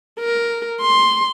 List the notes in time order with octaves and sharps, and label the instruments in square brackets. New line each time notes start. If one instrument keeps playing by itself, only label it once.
[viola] A#4
C6